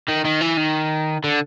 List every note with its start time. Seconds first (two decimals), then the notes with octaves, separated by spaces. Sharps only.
0.08 D#3
0.25 D#3
0.41 E3
0.57 D#3
1.24 D3